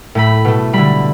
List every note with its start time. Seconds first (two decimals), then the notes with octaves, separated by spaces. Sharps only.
0.15 A2 A3 B5
0.45 B2 A3
0.73 D3 G3 B5